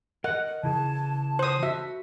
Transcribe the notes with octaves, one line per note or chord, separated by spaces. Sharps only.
A#4 D#5 F#5
C#3 E3 G#4 A5
C5 D#6
F#4 E5